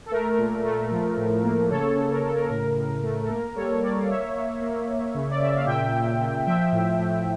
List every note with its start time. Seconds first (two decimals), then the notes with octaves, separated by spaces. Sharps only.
0.06 A4
0.11 A3 A#4
0.38 A#2
0.65 A3
0.91 F3
1.17 A2
1.44 A#3
1.70 C#3 A4 C#5
1.96 C#3
2.11 A#4
2.23 C#3 A4
2.36 A#4
2.50 A2 A#4
2.77 A2
3.03 A3
3.23 A4
3.29 A#3 A#4
3.56 G3 A4 C#5
3.81 G3 A#4 D5
3.98 F5
4.08 A#3 C#5 E5
4.35 A#3
4.62 A#3
4.88 A#3
5.14 C#3
5.30 D5
5.41 C#3 E5
5.55 F5
5.67 A#2 E5 G5
5.94 A#2
6.20 A#2
6.46 F3 E5 G5
6.73 A2
6.99 A2